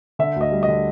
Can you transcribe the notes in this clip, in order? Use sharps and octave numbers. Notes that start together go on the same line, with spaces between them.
D3 E5
D2 D#5
G3
D#5
D3